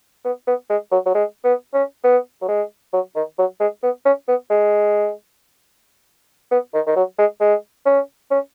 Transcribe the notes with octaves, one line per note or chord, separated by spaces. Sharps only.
B3
B3
G#3
F#3
F#3
G#3
B3
C#4
B3
F#3
G#3
F#3
D#3
F#3
G#3
B3
C#4
B3
G#3
B3
D#3
D#3
F#3
G#3
G#3
C#4
C#4